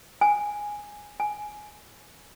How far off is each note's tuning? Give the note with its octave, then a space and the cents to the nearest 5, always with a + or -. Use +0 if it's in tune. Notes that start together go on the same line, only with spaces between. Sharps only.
G#5 -5
G#5 +10